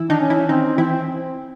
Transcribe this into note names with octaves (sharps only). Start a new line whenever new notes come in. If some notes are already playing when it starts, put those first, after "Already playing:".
Already playing: E3 E4
D#3 D4 D#4
C#4
E3 E4
D#3 C4 D#4
E3 C4 E4